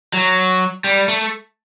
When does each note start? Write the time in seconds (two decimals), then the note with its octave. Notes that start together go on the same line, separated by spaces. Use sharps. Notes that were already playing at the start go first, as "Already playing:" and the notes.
0.14 F#3
0.84 G3
1.08 A3